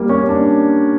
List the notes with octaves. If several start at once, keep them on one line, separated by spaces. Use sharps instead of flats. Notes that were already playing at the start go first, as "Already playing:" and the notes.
Already playing: G3 A#3
C#4
D4